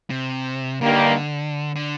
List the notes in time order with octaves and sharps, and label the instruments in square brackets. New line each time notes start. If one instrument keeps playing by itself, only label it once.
[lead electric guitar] C3
[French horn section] G2 D#3 G3 A#3 [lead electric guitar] D3
[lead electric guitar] D3